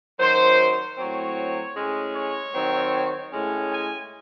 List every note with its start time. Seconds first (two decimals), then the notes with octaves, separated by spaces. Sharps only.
0.19 F#2 D#3 F#3 C5
0.98 A2 F#3 C4 C#5
1.75 A2 G#3 C#4
2.14 C#5
2.54 D#3 F#3 C4
3.32 A2 G#3 C#4
3.71 G#5